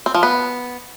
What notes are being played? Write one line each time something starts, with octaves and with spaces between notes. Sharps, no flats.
C4
F3
B3